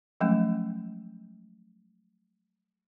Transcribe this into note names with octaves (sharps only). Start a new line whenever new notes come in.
F3 F#3 G#3 A3 C#4